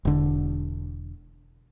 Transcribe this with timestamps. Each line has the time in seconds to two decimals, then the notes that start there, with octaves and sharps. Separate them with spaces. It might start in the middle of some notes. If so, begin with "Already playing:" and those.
0.05 E1 D3